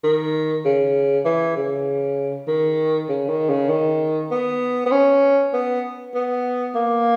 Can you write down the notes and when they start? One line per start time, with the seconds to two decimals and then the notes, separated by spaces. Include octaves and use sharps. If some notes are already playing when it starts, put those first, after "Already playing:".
0.04 D#3
0.65 C#3
1.25 E3
1.57 C#3
2.48 D#3
3.09 C#3
3.29 D#3
3.50 C#3
3.70 D#3
4.31 B3
4.86 B3
4.92 C#4
5.53 B3
6.15 B3
6.75 A#3